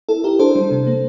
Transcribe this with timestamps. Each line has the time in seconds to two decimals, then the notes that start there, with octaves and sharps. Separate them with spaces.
0.09 E4 A4
0.24 E4 G4 A#4
0.39 D4 A4 C5
0.55 G3
0.71 C3
0.87 A#3